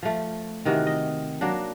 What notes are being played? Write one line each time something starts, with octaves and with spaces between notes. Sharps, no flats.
F3 A3
C3 D#3 E3 F#4
D#5
F#3 A#3 D4